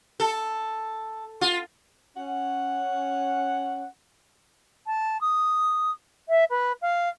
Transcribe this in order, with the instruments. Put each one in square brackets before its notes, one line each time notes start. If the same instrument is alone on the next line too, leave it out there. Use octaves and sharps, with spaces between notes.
[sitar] A4
F4
[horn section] C#4 F#5
[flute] A5
D#6
E5
B4
F5